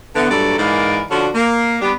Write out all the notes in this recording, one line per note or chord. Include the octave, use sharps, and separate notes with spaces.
D3 E3 B3
G2 A#2 F#3 A3 A4 D5
G#2 E3 A#3 D#4 A#4 D5
D3 F3 C#4 D4 F#4
A#3
G3 B3 D4 G4